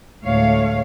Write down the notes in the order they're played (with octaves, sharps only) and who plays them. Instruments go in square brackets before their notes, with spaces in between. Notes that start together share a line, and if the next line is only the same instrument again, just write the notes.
[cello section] D2 A2 G#3 A3 C#5 F5